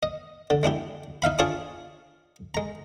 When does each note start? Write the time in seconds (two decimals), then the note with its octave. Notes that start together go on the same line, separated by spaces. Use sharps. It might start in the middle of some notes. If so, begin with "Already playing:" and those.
0.03 D#5
0.50 D3
0.63 G#3 D4 E4 G4
1.22 D#4 E5 F5 B5
1.39 D4 F4 G#4 C#5 A5 D6
2.55 G#3 A#5